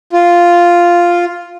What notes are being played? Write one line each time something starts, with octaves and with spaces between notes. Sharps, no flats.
F4